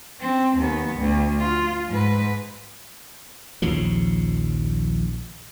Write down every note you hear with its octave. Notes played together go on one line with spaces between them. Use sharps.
C4
D#2 B3
D2
F4
G#2 B4
A#1 D#2 C#3 F3